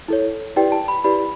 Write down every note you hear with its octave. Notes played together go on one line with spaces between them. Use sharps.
E4 A4 C#5
E4 G4 B4 D5 G5
A5
B5
E4 G4 B4 D5 B5